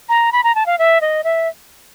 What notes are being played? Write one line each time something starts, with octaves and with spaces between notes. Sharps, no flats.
A#5
B5
A#5
A5
F5
E5
D#5
E5